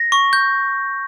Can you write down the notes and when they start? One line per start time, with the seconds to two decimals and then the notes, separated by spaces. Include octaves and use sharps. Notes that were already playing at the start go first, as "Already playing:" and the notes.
Already playing: A#6
0.12 C#6
0.33 G6